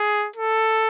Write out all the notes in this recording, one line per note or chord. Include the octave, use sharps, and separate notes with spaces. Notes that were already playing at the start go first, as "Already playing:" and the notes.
Already playing: G#4
A4